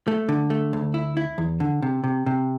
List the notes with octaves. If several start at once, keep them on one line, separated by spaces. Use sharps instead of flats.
A3
D3
A3
D2
E4
E4
E2
D3
C3
C3
C3